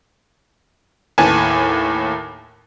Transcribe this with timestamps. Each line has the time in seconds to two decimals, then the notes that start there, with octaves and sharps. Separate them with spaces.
1.18 D#2 A2 B4 G#5 A5